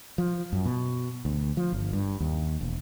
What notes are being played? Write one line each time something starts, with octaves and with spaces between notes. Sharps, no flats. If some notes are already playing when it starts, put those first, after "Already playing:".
F3
F#2
B2
D2
F3
G1
G2
D#2
E1